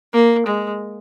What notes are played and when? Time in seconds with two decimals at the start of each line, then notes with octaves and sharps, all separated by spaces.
0.14 A#3
0.46 G#3